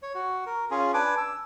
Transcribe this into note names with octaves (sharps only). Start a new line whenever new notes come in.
C#5
F#4
A#4
C#4 F4 G#4
D4 B4 G#5 D6
E6